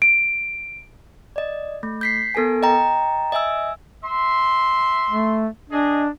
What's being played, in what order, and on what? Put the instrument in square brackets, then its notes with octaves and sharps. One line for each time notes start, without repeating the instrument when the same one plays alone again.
[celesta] D7
[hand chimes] D5 D#5
A3
G6 B6 C7
B3 A4 A#4 G#5
D#5 G5 A#5
D#5 E5 G#5 E6
[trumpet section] E5 C6
[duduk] A3
[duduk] D4 [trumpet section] G#4 D#5